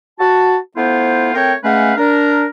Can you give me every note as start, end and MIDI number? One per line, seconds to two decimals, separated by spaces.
0.19 0.57 66
0.19 0.57 81
0.77 1.34 57
0.77 1.34 59
0.77 1.34 64
0.77 1.34 65
0.77 1.34 72
1.35 1.53 57
1.35 1.53 60
1.35 1.53 70
1.35 1.53 73
1.35 1.53 79
1.64 1.94 56
1.64 1.94 57
1.64 1.94 61
1.64 1.94 71
1.64 1.94 77
1.64 1.94 78
1.97 2.46 62
1.97 2.46 70